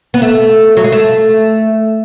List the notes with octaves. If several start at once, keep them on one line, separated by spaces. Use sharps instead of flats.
B3
A3
F#3
G#3
A3